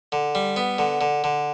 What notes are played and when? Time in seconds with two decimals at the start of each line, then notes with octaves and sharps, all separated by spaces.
0.12 D3
0.35 G3
0.56 B3
0.79 D3
1.01 D3
1.24 D3